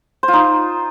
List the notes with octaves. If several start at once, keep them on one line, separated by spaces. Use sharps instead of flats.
C5
F4
D#4